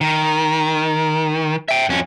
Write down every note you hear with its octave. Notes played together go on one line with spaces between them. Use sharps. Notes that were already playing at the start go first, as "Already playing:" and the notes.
D#3
E5 G5
F2 C#4